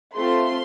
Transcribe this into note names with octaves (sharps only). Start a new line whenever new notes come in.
A3 C4 F4 C6